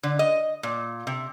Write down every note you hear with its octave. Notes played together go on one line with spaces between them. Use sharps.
D3
D#5
A#2
C3